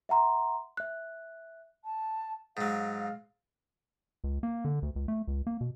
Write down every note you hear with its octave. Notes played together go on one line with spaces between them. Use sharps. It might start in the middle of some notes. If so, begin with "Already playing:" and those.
E5 F#5 A#5 C6
E5 F#6
A5
G#2 F#3 F5
C#2
A#3
D3
D2
C#2
A3
C#2
A#3
B2